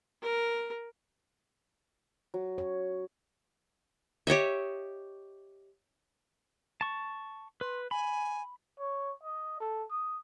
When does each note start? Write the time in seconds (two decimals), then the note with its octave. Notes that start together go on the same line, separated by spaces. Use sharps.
0.23 A#4
2.34 F#3
2.58 C#5
4.27 G4 C#5 D#5 E5
6.81 A5 C#6
7.61 B4 C6
7.91 G#5 B5
8.79 C#5
9.23 D#5
9.60 A4
9.90 D#6